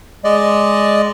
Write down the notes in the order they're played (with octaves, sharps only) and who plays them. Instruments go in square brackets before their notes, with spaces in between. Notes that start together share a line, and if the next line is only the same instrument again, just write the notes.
[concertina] G#3 D5 D#5